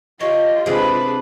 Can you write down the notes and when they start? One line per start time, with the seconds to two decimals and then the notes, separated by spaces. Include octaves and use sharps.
0.20 F4 G4 C#5 D#5
0.66 C3 G#3 D4 G#4 B4